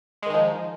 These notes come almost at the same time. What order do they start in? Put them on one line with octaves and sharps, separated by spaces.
G#3 D#3 D#4 F3